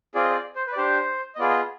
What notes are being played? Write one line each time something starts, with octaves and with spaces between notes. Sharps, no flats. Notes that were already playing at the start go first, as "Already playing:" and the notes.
C4 F4 G#4 D5
D#5
D5
C5
B4
D5
D4 G4 C5
D#5
B3 F4 G#4 D5
D#5